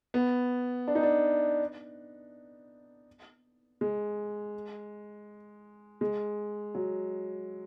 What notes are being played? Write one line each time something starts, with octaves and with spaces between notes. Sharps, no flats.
B3
D4
D#4
D4
G#3
G#3
F#3